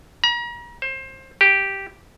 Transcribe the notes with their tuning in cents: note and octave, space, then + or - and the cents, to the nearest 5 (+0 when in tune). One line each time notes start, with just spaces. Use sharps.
A#5 +40
C5 +25
G4 -5